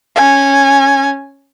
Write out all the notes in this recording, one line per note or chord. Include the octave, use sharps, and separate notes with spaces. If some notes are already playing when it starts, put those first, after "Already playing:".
C#4 G#5